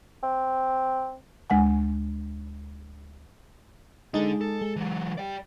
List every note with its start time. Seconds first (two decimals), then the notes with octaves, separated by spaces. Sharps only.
0.23 C4
1.50 D2 G#3 F#5 G#5
4.14 G#3 D4 D#4 A4
4.41 A4
4.62 G#3
4.76 E3 F#3
5.18 D5 G5